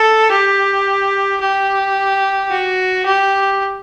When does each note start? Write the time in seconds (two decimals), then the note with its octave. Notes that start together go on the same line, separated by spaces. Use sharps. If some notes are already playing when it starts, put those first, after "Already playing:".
Already playing: A4
0.31 G4
1.41 G4
2.51 F#4
3.06 G4